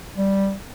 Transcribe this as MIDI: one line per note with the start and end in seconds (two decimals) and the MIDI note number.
0.16 0.53 55